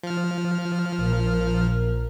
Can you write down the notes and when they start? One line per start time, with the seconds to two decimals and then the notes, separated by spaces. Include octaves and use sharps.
0.03 F3 F6
0.97 A#1 A#2 A#4